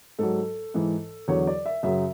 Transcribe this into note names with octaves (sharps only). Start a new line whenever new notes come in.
G#2 F#3 A4
G#2 E3
E2 D3 F#3 C#5
D5
E5
F#2 C#3 F#3 E5